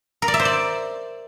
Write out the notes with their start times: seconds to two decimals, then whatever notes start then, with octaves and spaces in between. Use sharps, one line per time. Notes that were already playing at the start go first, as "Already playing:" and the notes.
0.22 A#4
0.28 D5
0.34 E5
0.39 C5
0.45 D5